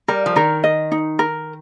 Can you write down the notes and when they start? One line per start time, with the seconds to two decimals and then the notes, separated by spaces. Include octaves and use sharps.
0.08 G3 A#4
0.26 F3
0.36 D#3 A#4
0.64 D#5
0.92 D#4
1.19 A#4